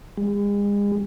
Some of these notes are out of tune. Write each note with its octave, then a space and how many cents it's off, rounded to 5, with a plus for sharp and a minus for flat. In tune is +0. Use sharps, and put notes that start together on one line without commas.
G#3 -40